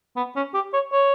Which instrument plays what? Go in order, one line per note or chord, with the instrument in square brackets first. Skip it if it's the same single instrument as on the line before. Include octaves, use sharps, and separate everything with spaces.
[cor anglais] B3
C#4
G4
C#5
C#5